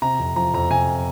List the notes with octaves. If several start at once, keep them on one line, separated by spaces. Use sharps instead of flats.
C3 A#5
F2
F3 A#5
F2 A#5
C3 G#5